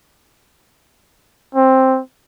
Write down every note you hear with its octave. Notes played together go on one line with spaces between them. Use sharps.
C4